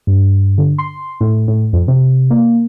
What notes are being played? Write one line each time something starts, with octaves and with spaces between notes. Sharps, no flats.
G2
D3
C6
A2
A2
F2
C3
A#3